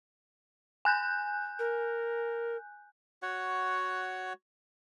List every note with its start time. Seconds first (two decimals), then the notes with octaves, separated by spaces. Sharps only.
0.85 G#5 F#6 G6
1.59 A#4
3.22 F#4 C#5 F#5